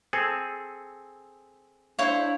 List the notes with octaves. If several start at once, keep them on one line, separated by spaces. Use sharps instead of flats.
C4 G#4 A4
D4 E4 C5 C#5 F5